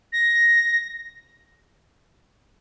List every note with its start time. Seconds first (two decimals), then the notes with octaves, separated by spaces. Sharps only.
0.13 A#6